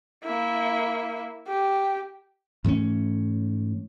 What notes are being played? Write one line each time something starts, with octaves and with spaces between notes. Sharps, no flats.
A#3 E4
G4
G#2 E3 A3 C#4